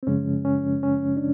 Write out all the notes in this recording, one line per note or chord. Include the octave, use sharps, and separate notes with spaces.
C4
F#2 C#3 F3 G#3 C#4
C#4
C#4
D4